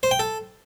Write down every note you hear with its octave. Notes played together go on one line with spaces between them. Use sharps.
C5
G5
A4